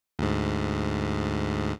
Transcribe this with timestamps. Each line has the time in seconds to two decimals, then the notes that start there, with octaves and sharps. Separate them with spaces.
0.19 D2 G#2